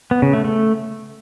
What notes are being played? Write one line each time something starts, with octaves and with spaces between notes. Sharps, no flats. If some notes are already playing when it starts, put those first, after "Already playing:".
B3
C#3
A3
A3